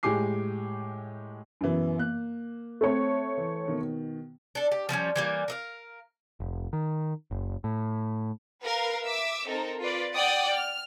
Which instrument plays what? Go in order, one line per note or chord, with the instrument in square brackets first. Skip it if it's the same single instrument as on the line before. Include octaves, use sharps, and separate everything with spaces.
[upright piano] A2 G#3 G4 G#5 D6 C7
F#2 B2 E3
A#3 F#6
[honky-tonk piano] A3 C4 C#5
[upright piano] E3
B2 D#3
[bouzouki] D4 A4
G4
F3 G3 B3 C#4
E3 G3 A#3
A#4 D#5 F5
[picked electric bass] F1
D#3
F#1
A2
[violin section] A#4 B4 F5
E5 D6 E6
C4 D#4 A4 A#4
F4 B4 D5
D5 F#5 G5 D#6
F6